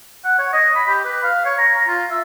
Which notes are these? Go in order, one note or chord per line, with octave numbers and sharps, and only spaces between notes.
F#5
C#5
D#5
B5
G4
B4
F5
C#5
A#5
A#5
F4
E5